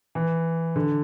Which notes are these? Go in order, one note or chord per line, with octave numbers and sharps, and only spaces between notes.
E3
D3